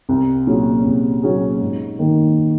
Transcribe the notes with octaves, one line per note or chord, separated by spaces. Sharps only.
C2
A#2 F#3 C#4 G#4
C2
A#2 F#3 C#4 G#4
G#2
D#3 A#3